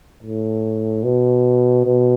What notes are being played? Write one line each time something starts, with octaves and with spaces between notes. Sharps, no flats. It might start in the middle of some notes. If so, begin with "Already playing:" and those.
A2
B2
B2